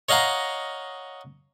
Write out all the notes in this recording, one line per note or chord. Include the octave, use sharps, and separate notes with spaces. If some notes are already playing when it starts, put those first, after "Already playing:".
C#5 D#5 F5 F#5 A#5